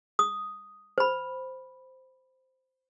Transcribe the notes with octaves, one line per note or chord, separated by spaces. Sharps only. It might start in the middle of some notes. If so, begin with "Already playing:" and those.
D#6
C5 B5